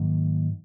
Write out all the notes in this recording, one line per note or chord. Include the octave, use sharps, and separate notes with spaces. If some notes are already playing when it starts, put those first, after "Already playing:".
Already playing: G#2 D#3 F#3 A#3